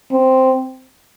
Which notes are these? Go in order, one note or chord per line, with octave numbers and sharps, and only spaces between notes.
C4